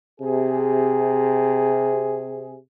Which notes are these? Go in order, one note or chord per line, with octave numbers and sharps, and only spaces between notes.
C3 G#4